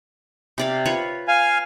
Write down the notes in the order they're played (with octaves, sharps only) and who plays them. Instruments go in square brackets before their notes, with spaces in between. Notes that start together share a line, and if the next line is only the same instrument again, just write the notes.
[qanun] C3 D5 F5
F4 B4 C#5
[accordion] F5 G#5